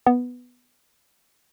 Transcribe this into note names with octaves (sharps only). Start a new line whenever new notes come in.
B3